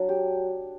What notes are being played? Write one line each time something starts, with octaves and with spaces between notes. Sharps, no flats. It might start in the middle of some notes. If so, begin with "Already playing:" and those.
Already playing: F#3 D4
G4